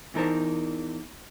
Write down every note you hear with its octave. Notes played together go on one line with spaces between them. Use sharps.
E2 E3 D#4 A#4 C5 A5